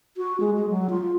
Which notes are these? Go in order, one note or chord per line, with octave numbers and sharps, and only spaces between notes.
F#4
G#3
G#3
F#3
F4